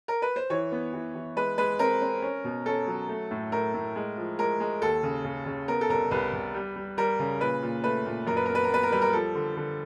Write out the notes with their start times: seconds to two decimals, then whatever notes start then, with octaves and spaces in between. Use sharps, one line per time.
0.08 A#4
0.22 B4
0.36 C5
0.50 E3 C#5
0.72 B3
0.93 E3
1.15 E3
1.36 G#3 B4
1.58 G#3 B4
1.79 C4 A#4
2.02 C4
2.22 C#4
2.44 B2
2.66 C#4 A4
2.87 F#3
3.09 A3
3.31 A2
3.52 A2 A#4
3.74 A2
3.96 G#3
4.17 F3
4.39 G#3 A#4
4.60 G#3
4.82 D#2 A4
5.03 C#3
5.25 C#3
5.46 C#3
5.68 B3 A#4
5.81 A4
5.89 C2 A#4
6.11 C2 B4
6.33 C2
6.54 G3
6.76 G3
6.97 G3 A#4
7.19 C#3
7.40 A#2 B4
7.63 A#2
7.84 A3 B4
8.06 A#2
8.27 F#2 A#4
8.37 B4
8.46 B3 A#4
8.55 B4
8.64 A#4
8.70 B3 B4
8.83 A#4
8.92 G3 B4
9.02 A#4
9.13 F3 A4
9.35 D3
9.57 D3